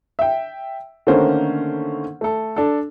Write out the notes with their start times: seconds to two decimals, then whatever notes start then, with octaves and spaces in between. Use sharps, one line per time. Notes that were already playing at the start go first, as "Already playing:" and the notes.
0.19 E5 G5
1.07 D3 D#3 A3 A#3 C#4 C5
2.21 A3 A4
2.56 D4 A4